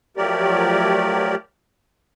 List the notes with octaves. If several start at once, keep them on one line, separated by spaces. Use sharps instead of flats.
F3 F#3 A3 G4 A#4 D5